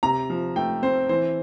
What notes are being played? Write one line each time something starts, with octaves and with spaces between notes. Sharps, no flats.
C3 A#5
F3
A3 G5
C4 C5
E3 C5